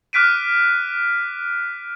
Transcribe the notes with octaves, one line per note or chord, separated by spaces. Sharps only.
D6 F6 F#6 B6 D7 D#7